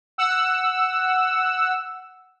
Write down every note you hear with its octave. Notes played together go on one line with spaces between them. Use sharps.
F#5 E6